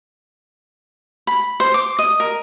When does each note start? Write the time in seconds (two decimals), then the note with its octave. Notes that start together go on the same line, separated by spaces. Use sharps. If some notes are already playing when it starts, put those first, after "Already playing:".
1.27 B5
1.60 C5
1.74 D6
1.99 D#5
2.20 A#4